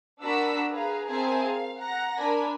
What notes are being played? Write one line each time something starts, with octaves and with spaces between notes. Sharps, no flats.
D4 F#4 A#4 B5 E6 B6
G#4 B4 F5 A#5
C4 G#4 A#4 E5 G#5 A5
F5
F#5 A#5 A#6
D4 A#4 G#5 B5